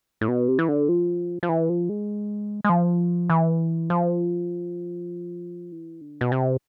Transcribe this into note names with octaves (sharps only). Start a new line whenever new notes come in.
A2
B2
C3
E3
D3
F3
F3
E3
F3
G#3
G#3
F3
E3
F3
E3
D3
B2
C3